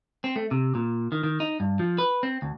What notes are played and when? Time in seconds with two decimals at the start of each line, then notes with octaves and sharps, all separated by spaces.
0.24 C4
0.36 A3
0.51 C3
0.75 A#2
1.12 D#3
1.24 D#3
1.40 D#4
1.60 G2
1.79 F3
1.98 B4
2.23 C4
2.42 D2